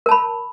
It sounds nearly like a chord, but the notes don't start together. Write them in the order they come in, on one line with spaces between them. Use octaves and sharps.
A#4 A5 B5